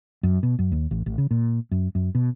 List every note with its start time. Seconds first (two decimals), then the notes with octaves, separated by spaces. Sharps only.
0.23 F#2
0.43 B2
0.59 F#2
0.72 D#2
0.91 A1
1.06 A1
1.18 C#3
1.31 A#2
1.71 F#2
1.95 F#2
2.15 B2